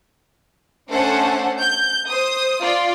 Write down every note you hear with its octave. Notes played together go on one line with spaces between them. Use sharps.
A3 C#4 D4 A4 C5 F#5
G6
C5 D#6
F4 D5